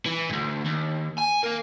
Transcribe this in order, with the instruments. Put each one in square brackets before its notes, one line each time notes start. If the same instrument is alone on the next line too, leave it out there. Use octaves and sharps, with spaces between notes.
[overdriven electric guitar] E3
D2 G#2
D#2
G#5
A#3 A#4